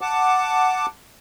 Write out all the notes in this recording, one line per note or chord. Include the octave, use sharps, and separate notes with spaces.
F#5 A5 D6